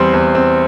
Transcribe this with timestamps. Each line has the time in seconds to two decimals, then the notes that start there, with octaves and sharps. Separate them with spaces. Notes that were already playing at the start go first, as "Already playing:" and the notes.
Already playing: E2 G3 C4 C6
0.13 E2
0.35 C4